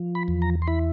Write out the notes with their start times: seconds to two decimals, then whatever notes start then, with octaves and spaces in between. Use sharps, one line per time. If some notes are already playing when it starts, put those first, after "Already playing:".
Already playing: F3
0.15 B5
0.28 E2
0.42 A#5
0.62 C6
0.67 E4 B5